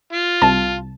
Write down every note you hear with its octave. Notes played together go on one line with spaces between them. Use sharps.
F4
C2 A5